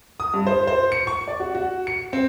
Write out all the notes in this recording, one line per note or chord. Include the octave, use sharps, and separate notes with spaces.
D#6
G2
C5
C5
C#7
C#6
D5
F#4
F#4
C#7
C4